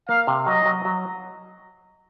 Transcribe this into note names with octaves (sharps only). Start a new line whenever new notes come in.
A#3 F5
C3
F#3 D#5
F#3
F#3